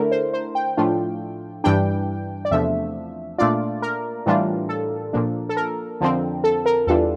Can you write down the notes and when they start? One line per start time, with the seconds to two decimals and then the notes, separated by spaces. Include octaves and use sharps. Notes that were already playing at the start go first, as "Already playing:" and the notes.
Already playing: D3 A3 E4 A#4
0.11 C5
0.33 C5
0.55 G5
0.77 A2 F3 A3 D4 F4
1.64 G2 E3 G3 D4 G5
2.45 D5
2.51 E2 C3 F3 A3 D4 E5
3.38 A#2 A3 D4 F4 D5
3.82 A#4
4.26 A2 E3 G3 D4 F4
4.69 A4
5.13 A#2 F3 A#3 D4
5.49 A4
5.56 A#4
6.01 F2 D3 F3 C4
6.44 A4
6.66 A#4
6.87 E2 E3 G3 D4 F4 A4